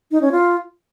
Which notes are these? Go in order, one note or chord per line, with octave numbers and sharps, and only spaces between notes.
D#4
C#4
F4